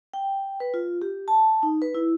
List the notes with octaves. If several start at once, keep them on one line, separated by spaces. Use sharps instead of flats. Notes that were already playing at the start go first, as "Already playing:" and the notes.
G5
B4
F4
G4
A5
D#4
B4
E4